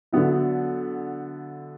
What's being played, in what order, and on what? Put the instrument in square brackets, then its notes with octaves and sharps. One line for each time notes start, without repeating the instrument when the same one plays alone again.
[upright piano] D3 F#3 B3 E4